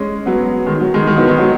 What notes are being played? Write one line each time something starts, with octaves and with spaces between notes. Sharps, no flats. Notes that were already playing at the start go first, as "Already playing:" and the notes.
Already playing: G#3 C#4
F#3 B3
D#3 G#3
F#3
D#3 G#3
D#3 G#3
F#3 B3
D#3 G#3
F#3 B3